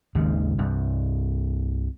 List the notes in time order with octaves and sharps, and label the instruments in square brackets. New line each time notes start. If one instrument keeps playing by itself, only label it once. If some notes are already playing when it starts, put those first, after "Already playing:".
[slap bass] G#1 D#2 G#2 C#3
C2 G2